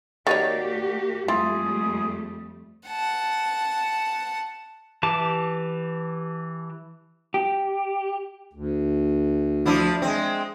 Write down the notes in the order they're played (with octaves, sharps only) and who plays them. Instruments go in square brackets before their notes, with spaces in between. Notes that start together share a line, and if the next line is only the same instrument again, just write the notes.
[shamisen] D#3 D#4 C#5 [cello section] A#3 F#4 G4 [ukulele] D5 F#5
[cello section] F2 G3 A3 [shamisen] E4 [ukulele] F4 [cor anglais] G#4
[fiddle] F#5 A5
[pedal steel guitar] E3 G4 A5 D6
[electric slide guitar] G4
[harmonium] D2
[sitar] F3 D4 E4
G#3 C4